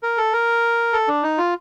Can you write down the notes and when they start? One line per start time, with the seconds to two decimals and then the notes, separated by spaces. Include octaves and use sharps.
0.03 A#4
0.18 A4
0.33 A#4
0.93 A4
1.08 D4
1.23 D#4
1.38 F4